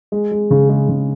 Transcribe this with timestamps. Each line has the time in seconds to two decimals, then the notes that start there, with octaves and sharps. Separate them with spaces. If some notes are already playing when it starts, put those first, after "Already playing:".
0.12 G#3
0.32 G#3
0.51 C#3
0.69 G#3
0.89 C#3